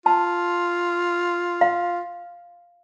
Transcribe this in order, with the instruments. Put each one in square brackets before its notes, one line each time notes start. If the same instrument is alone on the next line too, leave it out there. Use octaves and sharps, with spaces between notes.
[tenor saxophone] F4 [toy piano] A5
[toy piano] F5